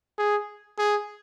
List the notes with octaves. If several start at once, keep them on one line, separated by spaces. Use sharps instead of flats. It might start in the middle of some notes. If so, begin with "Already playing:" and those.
G#4
G#4